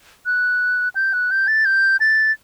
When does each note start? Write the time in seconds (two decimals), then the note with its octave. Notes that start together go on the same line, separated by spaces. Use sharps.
0.26 F#6
0.95 G6
1.13 F#6
1.31 G6
1.48 A6
1.65 G6
2.00 A6